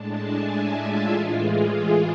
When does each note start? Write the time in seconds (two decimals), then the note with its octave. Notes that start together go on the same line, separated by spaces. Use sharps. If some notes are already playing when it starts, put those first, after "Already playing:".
Already playing: A2 G#3 D4 A5
0.20 G#5
0.50 E5
0.81 F4
1.11 A2 E3 G#3 F4
1.40 G#4